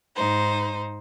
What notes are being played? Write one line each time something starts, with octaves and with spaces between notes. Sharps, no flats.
G#2 D#4 C5